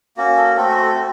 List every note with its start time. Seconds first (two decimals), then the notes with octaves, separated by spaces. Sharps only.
0.17 A#3 C#4 F#4
0.37 A4
0.56 A3 C4 F#4 A4
0.69 A4
0.83 A4
0.95 C4 F#4